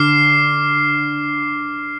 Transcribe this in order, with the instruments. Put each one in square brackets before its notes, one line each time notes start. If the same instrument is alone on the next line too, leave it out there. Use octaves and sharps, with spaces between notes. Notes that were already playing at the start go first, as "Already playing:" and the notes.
Already playing: [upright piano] D3 [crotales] D6 F6 C7